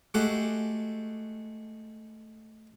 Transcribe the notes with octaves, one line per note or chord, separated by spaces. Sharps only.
G#3 A3 F#4 G4 A4 F#5